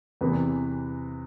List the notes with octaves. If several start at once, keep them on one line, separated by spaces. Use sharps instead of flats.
E2 C3 E3 B4